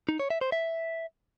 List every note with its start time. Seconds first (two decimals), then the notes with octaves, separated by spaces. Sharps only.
0.09 D#4
0.20 C#5
0.30 E5
0.41 C5
0.52 E5